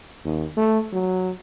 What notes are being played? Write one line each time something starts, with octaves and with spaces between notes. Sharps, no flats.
D#2
A3
F#3